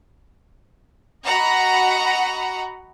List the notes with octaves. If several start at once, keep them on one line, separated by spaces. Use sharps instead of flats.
F#4 D#5 F#5 A#5 B5